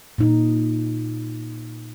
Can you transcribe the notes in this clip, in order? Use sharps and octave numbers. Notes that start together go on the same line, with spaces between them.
A#2 D#4